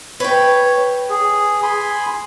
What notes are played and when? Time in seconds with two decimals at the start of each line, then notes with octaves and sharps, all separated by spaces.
0.20 B4 C#5 G5
1.09 G#4
1.63 G#5 B5 C6